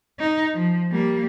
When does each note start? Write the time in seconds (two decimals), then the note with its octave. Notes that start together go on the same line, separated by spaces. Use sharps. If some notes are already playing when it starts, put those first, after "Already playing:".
0.19 D#4
0.54 F3
0.92 G3 A#3